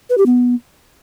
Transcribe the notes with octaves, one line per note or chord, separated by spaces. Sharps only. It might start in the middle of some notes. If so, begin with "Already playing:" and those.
B4
G4
B3